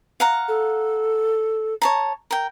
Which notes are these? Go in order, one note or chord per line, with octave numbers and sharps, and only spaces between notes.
F5 F#5 A#5
A4
C#5 A5 A#5
A#4 G5